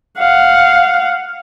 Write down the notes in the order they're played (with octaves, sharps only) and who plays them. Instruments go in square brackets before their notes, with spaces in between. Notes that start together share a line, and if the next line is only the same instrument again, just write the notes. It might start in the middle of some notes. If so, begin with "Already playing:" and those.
[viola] F5 F#5